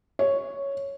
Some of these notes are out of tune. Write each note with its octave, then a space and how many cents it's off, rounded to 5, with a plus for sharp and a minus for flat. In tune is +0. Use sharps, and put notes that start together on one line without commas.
C#5 +0